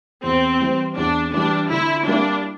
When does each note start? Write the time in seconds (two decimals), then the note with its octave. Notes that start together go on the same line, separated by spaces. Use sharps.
0.23 E2 C4
0.60 E3 G3
0.97 E2 D4
1.34 E3 G3 D4
1.71 D3 E4
2.08 G3 A#3 D4 E4 A#4